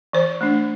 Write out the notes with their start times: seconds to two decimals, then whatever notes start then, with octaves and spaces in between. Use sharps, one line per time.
0.13 E3 C5
0.41 A3 D4